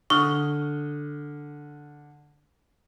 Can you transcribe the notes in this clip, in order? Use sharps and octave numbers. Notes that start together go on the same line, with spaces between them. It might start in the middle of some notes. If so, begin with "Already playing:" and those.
D3 C#6 D#6 F6